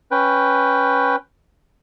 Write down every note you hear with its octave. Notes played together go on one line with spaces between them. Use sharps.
C#4 B4 G5